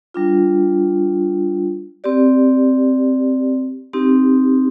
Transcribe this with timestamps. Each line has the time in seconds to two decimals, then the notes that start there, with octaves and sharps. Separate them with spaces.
0.14 G3 D4 F4
2.04 C4 G4 D5
3.93 C4 D#4 G4